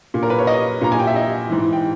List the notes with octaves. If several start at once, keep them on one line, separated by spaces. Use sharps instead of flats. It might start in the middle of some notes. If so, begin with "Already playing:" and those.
A#2
A#4
B4
C#5
D#5
A#2 A#5
G#5
G5
E5
D#5
G#2 E3
G5